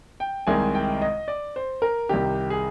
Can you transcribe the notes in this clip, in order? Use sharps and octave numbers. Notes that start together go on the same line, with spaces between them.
G5
C2 C3 D#3 G#3 G#5
G5
D#5
D5
C5
A#4
C2 C3 D#3 G4
G#4